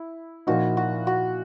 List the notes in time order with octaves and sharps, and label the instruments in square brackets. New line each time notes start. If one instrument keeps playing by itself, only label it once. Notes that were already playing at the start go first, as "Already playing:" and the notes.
Already playing: [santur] E4
[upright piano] A#2 F3 A#3 D#4 [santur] F#4
[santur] F#4
F#4